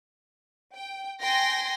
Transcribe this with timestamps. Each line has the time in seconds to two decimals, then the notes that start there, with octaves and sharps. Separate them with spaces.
0.75 G5
1.22 G5 G#5 C6 A#6